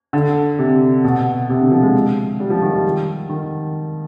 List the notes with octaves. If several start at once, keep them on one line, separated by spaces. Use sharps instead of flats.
D3
C3
B2
C3
D3
F3
G#3
G3
F3
D#3
G3
D#3